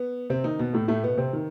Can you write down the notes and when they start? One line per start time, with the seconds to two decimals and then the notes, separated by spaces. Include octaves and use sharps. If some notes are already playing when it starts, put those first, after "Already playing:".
Already playing: B3
0.30 C3 C4
0.44 D#3 D#4
0.59 B2 B3
0.73 A2 A3
0.88 A2 A3
1.03 B2 B3
1.18 C3 C4
1.33 D#3